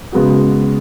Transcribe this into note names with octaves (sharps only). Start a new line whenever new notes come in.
C#3 G#3 B3 F#4